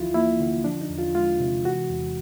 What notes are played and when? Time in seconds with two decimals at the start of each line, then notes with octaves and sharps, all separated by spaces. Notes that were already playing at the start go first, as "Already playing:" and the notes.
Already playing: D2 E3 F3 E4 F4
0.14 A#3 E4
0.40 D3
0.64 F3 D4
0.81 D#4
0.89 E2
0.98 F4
1.15 G#3 F4
1.40 C3
1.65 E3 F#4
1.89 E2